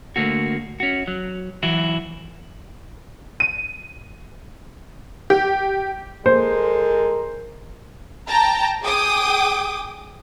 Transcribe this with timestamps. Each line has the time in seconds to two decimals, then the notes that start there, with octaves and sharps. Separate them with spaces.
0.16 D3 A3 A#3 F#4
0.80 C#4 F#4
1.08 F#3
1.63 E3 F#3 E4 F#4
3.40 D#7
5.30 G4
6.26 G#3 A4 A#4 C5
8.28 G5 A5 A#5
8.82 G#4 G5 D6 D#6